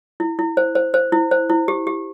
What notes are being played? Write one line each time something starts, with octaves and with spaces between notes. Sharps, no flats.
E4
E4
C5
C5
C5
E4
C5
E4
G4
G4